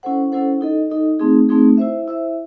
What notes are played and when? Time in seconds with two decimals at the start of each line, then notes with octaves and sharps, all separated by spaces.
0.03 C#4 E4 A4 C5 F#5
0.32 C#4 E4 A4 C5 F#5
0.61 D#4 A4 D#5
0.90 D#4 A4 D#5
1.19 A3 C4 D#4 G#4
1.49 A3 C4 D#4 G#4
1.77 E4 C5 E5
2.08 E4 C5 E5